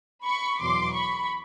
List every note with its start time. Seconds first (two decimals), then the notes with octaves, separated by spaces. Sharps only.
0.24 B5 C#6
0.60 E2 B2 F#3 C6 D6
0.94 B5 C#6